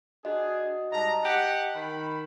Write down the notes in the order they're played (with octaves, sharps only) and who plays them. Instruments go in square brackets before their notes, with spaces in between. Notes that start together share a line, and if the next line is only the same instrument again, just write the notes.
[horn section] D4 G#4 [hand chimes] F#4 D#5
[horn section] G#2 G3 A#5 [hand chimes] D#5 A5
[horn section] G4 F#5
D#3 B5